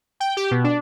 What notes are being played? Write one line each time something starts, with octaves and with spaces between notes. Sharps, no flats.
G5
G4
B2
D4